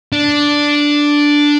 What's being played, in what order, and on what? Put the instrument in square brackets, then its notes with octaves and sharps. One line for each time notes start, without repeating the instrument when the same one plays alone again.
[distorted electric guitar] D4